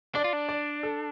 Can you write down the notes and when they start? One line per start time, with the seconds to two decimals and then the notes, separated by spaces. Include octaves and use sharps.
0.15 D4 D5
0.24 F4
0.33 D4
0.49 D5
0.83 A4